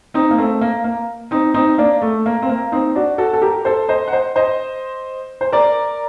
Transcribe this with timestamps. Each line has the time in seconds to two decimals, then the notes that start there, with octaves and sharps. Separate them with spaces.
0.14 C4 D#4
0.31 A#3
0.38 A3 C4
0.61 A#3
0.84 A#3
1.31 C4 D#4
1.54 C4 D#4
1.78 A#3 D4
2.02 A3
2.26 A#3
2.42 C4
2.49 A#3
2.72 C4 D#4
2.95 D4 F#4
3.18 F#4 A4
3.33 A4
3.42 G4 A#4
3.65 A4 C5
3.88 C5 D#5
4.08 F#5
4.12 C5 D#5
4.36 C5 D#5
5.41 C5
5.53 A#4 D5